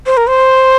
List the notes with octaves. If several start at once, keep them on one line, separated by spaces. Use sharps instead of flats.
C5
A#4
C5